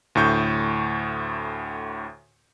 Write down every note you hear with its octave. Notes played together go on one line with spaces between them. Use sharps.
D2 A2 C#6 G6